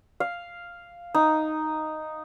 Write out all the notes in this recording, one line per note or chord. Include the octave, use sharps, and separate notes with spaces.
F5
D#4